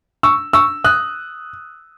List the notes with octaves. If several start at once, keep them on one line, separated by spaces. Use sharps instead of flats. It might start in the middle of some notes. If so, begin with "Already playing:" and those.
C#6 E6
C#6 E6
D#6 F#6